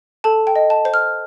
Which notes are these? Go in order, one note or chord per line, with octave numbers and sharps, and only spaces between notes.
A4 A5
G5
D#5
A5
C5
F6